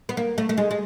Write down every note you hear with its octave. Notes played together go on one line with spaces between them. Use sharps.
B3
A#3
A3
A3
G#3
G#3